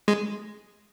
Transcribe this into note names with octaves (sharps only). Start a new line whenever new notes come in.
G#3